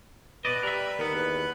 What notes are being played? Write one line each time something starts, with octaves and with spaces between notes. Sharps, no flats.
B2 B4 D5 D#5 B5
G3 A#4 E5
D#2 B3 A#4
E2